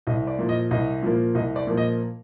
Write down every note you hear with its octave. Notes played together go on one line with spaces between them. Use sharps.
C2 D#5
D5
A#2 F3 A#3
D#5
C2 D#5
A#2 F3 A#3
C2 D#5
D5
A#2 F3 A#3
D#5